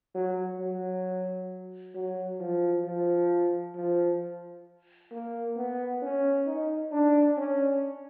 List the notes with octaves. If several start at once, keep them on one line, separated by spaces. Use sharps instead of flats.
F#3
F#3
F#3
F3
F3
F3
A#3
B3
C#4
D#4
D4
C#4